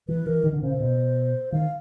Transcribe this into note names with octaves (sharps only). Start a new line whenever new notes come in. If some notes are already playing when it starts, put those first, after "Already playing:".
E3 B4
E3 A#4
D#3
D3
C#3 C5
C3
B2
D#3 F5